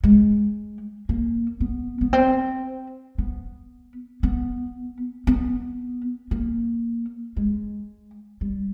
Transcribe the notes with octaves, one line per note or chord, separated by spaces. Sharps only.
G#3
A#3
B3
B3
C4
B3
B3
B3
A#3
G#3
G3